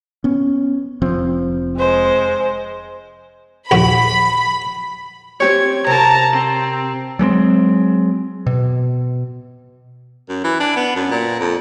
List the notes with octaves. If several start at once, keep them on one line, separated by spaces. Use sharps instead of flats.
B3 C#4
F1 F3 C4
G#3 C5
A#1 D#2 F#4 B5
C4 G4 C#5 G#6
C3 A#4 A5 A#5
C4
F#3 G#3 A#3 C4
B2
F#2
E3
D4
B3
F#2
A#2
F2